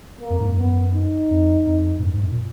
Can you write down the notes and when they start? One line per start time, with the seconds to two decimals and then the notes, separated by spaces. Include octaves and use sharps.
0.21 A#3
0.30 F2
0.40 G#2
0.49 F#2
0.58 B3
0.94 D#4
1.31 F2
1.67 F2
1.99 G#2
2.03 F#2
2.13 G#2
2.22 F#2
2.31 A#2